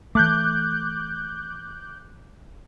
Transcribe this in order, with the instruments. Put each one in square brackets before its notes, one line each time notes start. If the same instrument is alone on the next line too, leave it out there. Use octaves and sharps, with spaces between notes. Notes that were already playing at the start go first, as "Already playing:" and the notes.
[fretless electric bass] E3 A3 [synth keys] D6 F#6 G6